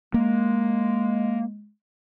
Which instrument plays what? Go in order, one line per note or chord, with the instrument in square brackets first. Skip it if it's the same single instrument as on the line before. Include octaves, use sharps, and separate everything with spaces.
[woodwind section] G#3 [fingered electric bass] A#3